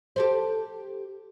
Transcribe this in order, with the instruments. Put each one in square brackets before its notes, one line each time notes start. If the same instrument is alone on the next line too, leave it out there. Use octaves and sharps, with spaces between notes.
[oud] G4 A4 C5